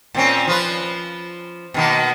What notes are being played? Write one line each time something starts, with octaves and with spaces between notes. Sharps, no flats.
A#2 C4 C#4
F3 F4 B4
B2 D#3 A#3